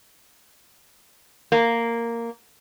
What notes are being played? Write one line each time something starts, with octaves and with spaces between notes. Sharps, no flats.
A#3